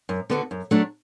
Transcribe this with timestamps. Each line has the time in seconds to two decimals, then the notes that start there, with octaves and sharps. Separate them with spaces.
0.09 F#2
0.30 D3 B3 F#4 A4
0.51 F#2
0.71 F#3 A3 D4